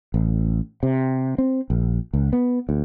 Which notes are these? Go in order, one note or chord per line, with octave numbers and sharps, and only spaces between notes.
A1
C3
C4
A#1
C#2
B3
D2